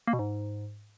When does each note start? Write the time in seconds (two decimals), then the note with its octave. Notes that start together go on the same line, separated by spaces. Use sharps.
0.07 A#3
0.13 B2
0.19 G#2